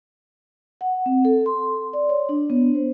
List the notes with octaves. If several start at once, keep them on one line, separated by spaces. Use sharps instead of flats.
F#5
C4
A4
C6
D5
C#5
D4
B3
C5